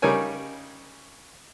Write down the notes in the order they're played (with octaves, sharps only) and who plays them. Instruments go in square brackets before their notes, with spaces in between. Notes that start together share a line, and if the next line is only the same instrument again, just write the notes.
[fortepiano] C#3 G3 D#4 A#4 C#5 G#5